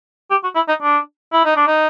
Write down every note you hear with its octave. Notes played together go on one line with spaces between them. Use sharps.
G4
F#4
E4
D#4
D4
E4
D#4
D4
D#4